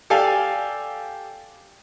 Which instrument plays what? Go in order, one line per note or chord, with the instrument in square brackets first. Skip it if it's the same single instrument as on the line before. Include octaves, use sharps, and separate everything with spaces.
[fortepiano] G4 A4 D5 F5 G#5